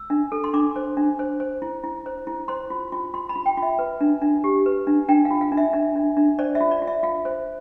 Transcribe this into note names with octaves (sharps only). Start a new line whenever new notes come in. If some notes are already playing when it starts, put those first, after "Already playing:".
Already playing: E6
D4
A4
C6
D4 D6
C5
D4
C5
C5
E4
E4
C5
E4
C5 C6
F4
F4
F4 C6
B5
F4
G5
F4
E5
B4
D4
D4
G4
B4
D4
D4 G5
F5
F4
F5
D4
E5
D4 E5
D4
D4
C5 D5
E5
F4
D5
F4
E5
F4 F5
C5